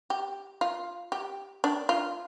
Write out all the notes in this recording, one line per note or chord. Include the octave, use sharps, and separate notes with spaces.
G4
F4
G4
D4
F4